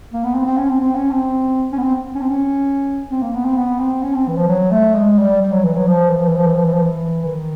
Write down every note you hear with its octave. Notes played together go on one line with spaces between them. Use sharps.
A#3
B3
C4
C4
C#4
C4
C4
C#4
C4
C#4
B3
C4
C#4
C4
C#4
C4
A#3
B3
C4
B3
C4
C#4
C4
E3
F3
F#3
A3
G#3
G3
G3
F#3
E3
F#3
F3
E3
F3
E3
F3
E3
F3
E3
F3
E3
D#3